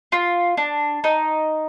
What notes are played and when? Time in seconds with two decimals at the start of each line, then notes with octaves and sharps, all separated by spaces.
0.12 F4
0.57 D4
1.04 D#4